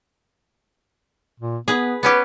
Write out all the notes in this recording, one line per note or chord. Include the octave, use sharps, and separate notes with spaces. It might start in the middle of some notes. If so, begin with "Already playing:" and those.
A#2
B3 G#4 B4
B3 C#4 G4 B4